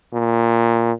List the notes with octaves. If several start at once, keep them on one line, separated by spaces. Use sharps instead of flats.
A#2